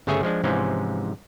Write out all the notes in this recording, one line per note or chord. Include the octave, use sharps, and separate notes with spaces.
G1 C#3 A3 G#4 C#5 E5
F3 G#3 D4
G#2 C3 E3 F3 G#3 C#4